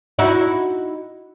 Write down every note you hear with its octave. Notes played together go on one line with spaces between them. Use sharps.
D#4 E4 F#4